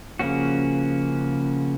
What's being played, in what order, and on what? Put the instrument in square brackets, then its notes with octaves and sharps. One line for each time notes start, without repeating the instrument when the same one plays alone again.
[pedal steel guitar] C#3 F3 A#3 C#4 F#4